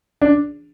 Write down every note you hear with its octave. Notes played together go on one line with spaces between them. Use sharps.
D4